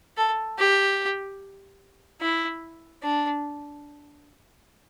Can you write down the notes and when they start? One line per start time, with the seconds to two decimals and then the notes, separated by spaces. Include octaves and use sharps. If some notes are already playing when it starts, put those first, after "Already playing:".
0.17 A4
0.58 G4
2.21 E4
3.03 D4